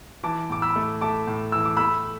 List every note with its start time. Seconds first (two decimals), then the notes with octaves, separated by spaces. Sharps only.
0.23 E3 A5 D6
0.50 A2 D6
0.62 B5 E6
0.76 A3
1.01 A3 A5 D6
1.27 A2
1.52 E3 E6
1.65 D6
1.77 A3 B5 E6